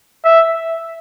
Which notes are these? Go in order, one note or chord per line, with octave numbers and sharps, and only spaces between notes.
E5